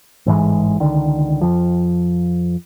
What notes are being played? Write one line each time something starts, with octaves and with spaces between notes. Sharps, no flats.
A1 G#2 E3 G#3
C#2 D3 D#3
F2 F3